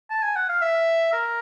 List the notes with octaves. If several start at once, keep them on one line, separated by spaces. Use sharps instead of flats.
A5
G#5
F#5
F5
E5
A#4